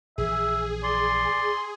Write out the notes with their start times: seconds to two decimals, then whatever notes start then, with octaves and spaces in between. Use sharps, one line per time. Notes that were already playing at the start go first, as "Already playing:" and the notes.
0.18 A#1 E3 G#4 E5
0.83 D5 C6